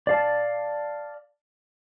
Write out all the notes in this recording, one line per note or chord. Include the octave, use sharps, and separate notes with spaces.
D5 F5 A5